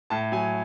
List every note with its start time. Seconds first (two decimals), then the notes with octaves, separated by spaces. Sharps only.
0.10 A2 A5
0.32 F#3 G#5